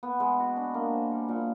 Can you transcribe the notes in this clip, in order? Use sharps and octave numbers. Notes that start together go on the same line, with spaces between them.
B3
G#3
F#4
D4
A#3
C5
G3
A#2